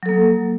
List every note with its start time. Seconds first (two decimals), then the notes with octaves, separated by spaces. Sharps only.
0.03 F#3
0.06 A4
0.09 A#3